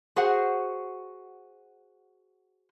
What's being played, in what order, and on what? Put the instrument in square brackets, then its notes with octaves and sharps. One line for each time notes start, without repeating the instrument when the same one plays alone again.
[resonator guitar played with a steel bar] F#4 G#4 C5 F#5